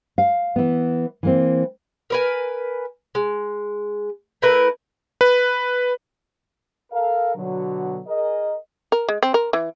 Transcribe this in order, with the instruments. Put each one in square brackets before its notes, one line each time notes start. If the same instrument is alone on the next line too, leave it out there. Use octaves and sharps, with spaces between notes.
[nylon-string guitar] F5
E3 B3
E3 A#3 C4
[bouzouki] A#4 B4 G#5
G#3
A3 E4 A#4 B4
[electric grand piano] B4
[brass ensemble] A4 A#4 F5
B2 D3 F#3
G#4 A#4 D#5
[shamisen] A#4
G#3
C4
A#4
E3